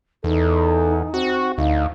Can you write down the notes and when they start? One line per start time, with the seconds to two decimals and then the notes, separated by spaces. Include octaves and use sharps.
0.24 E2 D#4 A4
1.14 C4 F#4
1.58 D2 D#4 F5